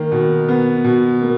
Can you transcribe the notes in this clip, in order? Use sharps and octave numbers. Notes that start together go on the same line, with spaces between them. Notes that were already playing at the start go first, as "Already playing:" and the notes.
Already playing: D#3 A#3
B2
B3
B2
A#3